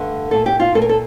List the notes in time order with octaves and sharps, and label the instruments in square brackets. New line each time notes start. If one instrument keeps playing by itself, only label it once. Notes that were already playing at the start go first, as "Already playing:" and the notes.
Already playing: [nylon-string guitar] G2 D3 A3
A#2 A3 A4
G4
F4
A#2 A3 A4
A#4
A4